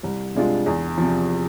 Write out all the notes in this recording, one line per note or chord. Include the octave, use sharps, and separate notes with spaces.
C2
C3 G#3 D4 F4
E2
C3 F3